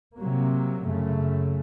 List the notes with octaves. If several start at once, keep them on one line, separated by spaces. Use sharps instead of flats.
C3 F#3 A#3
F#2 C#3 A3